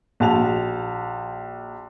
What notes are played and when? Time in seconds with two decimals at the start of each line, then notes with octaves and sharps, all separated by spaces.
0.20 A#1 F#4 A5 F7